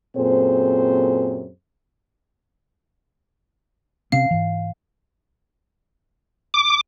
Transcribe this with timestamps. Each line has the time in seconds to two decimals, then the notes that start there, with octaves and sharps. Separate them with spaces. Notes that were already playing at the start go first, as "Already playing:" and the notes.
0.16 F#2 A#2 C4 G#4 A4 C5
4.12 C3 C4 C#4 F5
4.31 G#2 E3
6.54 D6